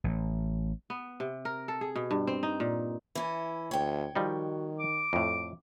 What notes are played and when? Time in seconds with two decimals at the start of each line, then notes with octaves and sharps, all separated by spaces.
0.04 A1
0.90 B3
1.20 C3
1.45 A#4
1.68 A4
1.81 G#4
1.96 B2
2.11 G2
2.27 C4
2.43 D#4
2.60 A#2
3.15 E3 C#4
3.71 D2 C#5 G5
4.15 D#3 F3 G3 D#4 F#4
4.79 D6
5.13 F2 A2